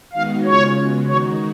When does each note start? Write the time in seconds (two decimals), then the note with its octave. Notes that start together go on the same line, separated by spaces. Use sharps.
0.13 D#3 G#3 B3 D#4 F#4 F5
0.44 C#3 G#3 C#4 F4 C#5
0.76 C#3 G#3 B3 F#4
1.07 D#3 G#3 D#4 F#4 C#5